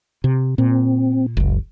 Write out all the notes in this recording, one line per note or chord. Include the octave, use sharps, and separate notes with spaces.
C3
A#2 C4
F#1 C#2